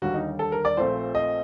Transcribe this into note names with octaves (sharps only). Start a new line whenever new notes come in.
D#2 D3 G3 F#4
D#4
A4
A#4
D5
A#1 A#2 A3 C4 C5
D#5